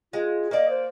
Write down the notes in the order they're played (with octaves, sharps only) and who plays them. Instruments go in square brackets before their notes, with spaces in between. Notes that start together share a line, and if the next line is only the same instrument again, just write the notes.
[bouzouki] G#3 [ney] F4
[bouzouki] A#3 D5 [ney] D#5
[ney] C5